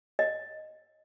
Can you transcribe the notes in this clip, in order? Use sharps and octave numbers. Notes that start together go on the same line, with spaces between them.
D#5